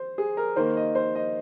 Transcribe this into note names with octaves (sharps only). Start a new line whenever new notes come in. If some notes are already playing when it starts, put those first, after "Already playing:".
Already playing: C5
G#4
A#4
D#3 A#3 C5
D#5
C5
D#5